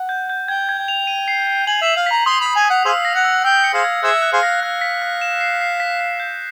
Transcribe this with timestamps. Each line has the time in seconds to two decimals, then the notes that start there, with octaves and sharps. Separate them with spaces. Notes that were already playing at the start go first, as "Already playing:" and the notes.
Already playing: F#5
0.09 G6
0.30 G6
0.48 G5 G#6
0.69 G#6
0.78 G5
0.88 F7
1.07 D#7
1.28 C7
1.47 C7
1.67 G#5 F#7
1.82 E5 F#7
1.96 F5
2.06 A#5 B6
2.26 C6 D#6
2.41 B5
2.46 D#6
2.56 G#5
2.65 F#5 D#6
2.85 G#4 C5 F5 E6
3.05 A#6
3.15 F#5
3.24 E6
3.44 G5 E6
3.64 C#7
3.74 G#4 C5 F5
3.84 G#6
4.03 G#4 C5 E5 F#6
4.22 F#6
4.33 G#4 C5 F5
4.43 A#6
4.62 F5 F#6
4.81 B6
5.02 F#6
5.21 E7
5.41 C7
5.61 C7
5.80 B6
6.00 B6
6.20 G6